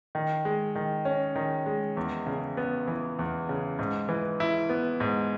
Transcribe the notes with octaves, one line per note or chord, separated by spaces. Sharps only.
D#3
G#3
D#3
C#4
D#3
G#3
E2
C#3
B3
E3
E2
C#3
G#2
E3
E4
B3
G#2